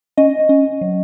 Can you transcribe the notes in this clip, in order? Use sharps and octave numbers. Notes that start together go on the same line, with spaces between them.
C#4 D#5
C#4
F#3